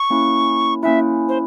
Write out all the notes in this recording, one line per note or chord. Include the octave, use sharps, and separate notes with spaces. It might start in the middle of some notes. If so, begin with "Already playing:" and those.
Already playing: C#6
A#3 C#4 E4
A#3 C#4 E4 E5
C5